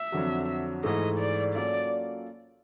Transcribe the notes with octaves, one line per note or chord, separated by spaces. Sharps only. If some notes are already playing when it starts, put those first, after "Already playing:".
Already playing: E5
F2 D3 F#3
G#2 E3 A3 D#5
D5
F#3 A#3 C#4 F4 A4 D5